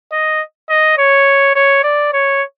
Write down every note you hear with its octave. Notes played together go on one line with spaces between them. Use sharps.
D#5
D#5
C#5
C#5
D5
C#5